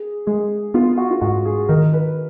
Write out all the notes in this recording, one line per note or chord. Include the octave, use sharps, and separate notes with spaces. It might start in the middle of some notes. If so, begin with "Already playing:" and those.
Already playing: G#4
G#3 G#4
B3 F4
F#4
F4
G#2 F#4
G#4
D#3 A#4
B4